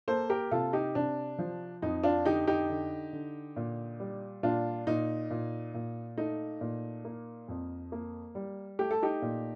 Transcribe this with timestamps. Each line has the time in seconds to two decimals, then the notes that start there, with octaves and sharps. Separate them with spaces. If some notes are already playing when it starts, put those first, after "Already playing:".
0.08 A#3 A4 C5
0.30 G4 A#4
0.51 C3 F4 A4
0.73 D#4 G4
0.95 C3 D4
1.39 F3
1.82 F2 D#4
2.04 D4 F4
2.25 D3 D#4 G4
2.47 D#4 G4
2.69 D3
3.13 D3
3.56 A#2
4.00 G3
4.43 A#2 D4 F4
4.87 A#2 D#4
5.30 A#2
5.74 A#2
6.17 A3 D#4
6.61 A#2
7.05 A#3
7.48 F2
7.92 A#3
8.35 G3
8.79 A3 G4
8.91 A4
9.03 D#4 G4
9.22 A#2